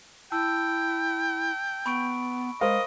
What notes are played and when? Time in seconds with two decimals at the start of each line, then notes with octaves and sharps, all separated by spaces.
0.32 E4 G5 A5 E6
1.86 B3 B5 C#6 D7
2.61 G#3 A#4 C5 D#5 F5